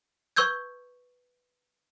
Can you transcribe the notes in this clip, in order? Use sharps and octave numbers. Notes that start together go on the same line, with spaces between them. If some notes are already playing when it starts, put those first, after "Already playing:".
B4 C#6 E6 G6 G#6